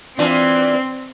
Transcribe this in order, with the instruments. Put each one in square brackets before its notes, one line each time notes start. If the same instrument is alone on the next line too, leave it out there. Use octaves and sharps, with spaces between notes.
[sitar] E3 D4 F4 [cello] C4